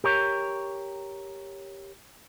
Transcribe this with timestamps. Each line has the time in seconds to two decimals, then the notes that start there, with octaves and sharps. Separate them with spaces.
0.04 G4 A#4 C#5